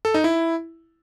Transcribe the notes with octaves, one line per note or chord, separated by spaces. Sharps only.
A4
D#4
E4